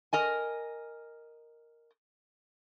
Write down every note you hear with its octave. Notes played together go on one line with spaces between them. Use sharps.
A#4 D#5 G#5